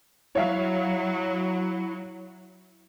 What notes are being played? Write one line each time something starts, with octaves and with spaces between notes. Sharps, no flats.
F#3 E4 C#5 E5 F5